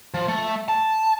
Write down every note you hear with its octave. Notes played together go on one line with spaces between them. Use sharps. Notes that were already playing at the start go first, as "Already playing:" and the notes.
F3
A3
A5